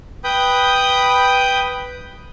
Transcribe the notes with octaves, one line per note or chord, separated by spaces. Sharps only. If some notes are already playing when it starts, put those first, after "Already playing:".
B4 G5 B5 D#6 G6